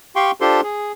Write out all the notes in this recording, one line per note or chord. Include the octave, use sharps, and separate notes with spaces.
G4 F5 G5 C6 C#6
D4 F4 G4 A4 C5 C6
G#4